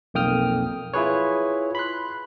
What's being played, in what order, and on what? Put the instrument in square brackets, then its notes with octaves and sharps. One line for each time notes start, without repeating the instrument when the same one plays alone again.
[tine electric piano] B1 F2 A#3 G5 D#6 F6
E4 F4 G#4 B4 C#5
B5 C6 F#6